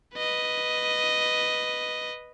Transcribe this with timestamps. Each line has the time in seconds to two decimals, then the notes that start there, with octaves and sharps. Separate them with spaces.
0.15 B4 D#5